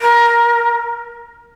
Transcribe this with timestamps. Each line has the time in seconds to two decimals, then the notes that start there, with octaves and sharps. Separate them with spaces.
0.01 A#4